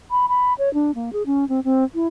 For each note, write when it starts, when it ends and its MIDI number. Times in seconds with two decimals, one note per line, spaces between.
0.11 0.26 83
0.29 0.53 83
0.58 0.72 73
0.74 0.94 62
0.95 1.10 58
1.13 1.23 68
1.26 1.47 61
1.49 1.60 60
1.64 1.84 60
1.94 2.07 64